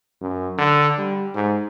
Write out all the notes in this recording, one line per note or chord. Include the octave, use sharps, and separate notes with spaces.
F#2
D3
G3
G#2